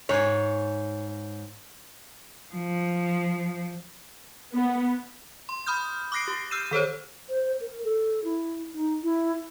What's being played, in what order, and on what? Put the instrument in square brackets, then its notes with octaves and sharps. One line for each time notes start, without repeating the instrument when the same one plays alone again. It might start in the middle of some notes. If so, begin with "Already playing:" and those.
[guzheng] G#2 G#5 [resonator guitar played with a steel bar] C#5
[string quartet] F3
[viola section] B3
[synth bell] C6
B5 D#6 F6 G6
D6 D#6 F#6 A#6 C7 D7
G4
E6 F6 G6 C7 D#7 E7
D#3 A4 C5 C#5
[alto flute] C5
A#4
A4
E4
D#4
E4